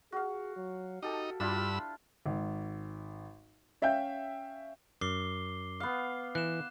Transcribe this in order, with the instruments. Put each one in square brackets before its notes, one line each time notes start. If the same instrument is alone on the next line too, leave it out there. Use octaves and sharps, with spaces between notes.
[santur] F#4 F5 [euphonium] G#4
[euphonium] F#3
[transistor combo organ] D#4 [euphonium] F#4 [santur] G4 A4
[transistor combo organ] G2 B5 E6 [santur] D4 E4 F4
[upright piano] G#1
C#4 E5 F5 G5 G6
[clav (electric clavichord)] F#2 [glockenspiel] D6 C7 G7
[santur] B3 F5
[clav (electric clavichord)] E3 [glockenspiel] F#6 E7